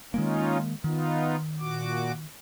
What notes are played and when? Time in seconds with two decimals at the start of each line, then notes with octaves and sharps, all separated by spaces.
0.14 D#3 G#3 A#3 C#4 D#4 F4
0.84 D#3 B3 D#4 F4
1.59 A#2 F#4 D6